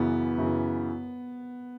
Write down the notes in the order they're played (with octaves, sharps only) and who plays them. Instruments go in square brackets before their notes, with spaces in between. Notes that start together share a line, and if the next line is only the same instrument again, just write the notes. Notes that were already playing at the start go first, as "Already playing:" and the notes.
Already playing: [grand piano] F#2 C#3 E3 [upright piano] B3
[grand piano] F#2 C#3 E3